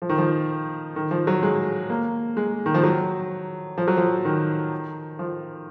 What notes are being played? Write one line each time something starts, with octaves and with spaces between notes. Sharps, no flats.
F3
D#3
F3
D#3
F3
F#3
G#3
A#3
G#3
D#3
F3
F#3
F3
F#3
F3
D#3
F3